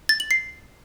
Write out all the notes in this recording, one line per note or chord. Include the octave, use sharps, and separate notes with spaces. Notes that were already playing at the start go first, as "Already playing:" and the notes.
A6
F#7
C7